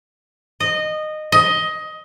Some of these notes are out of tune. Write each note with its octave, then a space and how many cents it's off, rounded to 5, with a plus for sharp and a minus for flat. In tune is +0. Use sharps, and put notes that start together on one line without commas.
D#5 -15
D#5 +15